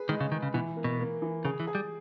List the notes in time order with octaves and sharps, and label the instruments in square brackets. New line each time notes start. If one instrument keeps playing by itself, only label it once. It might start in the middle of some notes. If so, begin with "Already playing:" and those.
Already playing: [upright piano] G#4 B4
[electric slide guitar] D#3 [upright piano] G#3
[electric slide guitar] C#3
[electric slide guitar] D#3 [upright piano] G#3
[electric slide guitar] C#3
[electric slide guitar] B2 [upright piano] E3
[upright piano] A#3
[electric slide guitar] B2
[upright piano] A#3
E3
[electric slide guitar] C#3 [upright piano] G#4
[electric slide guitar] E3
[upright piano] G#4
[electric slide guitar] G3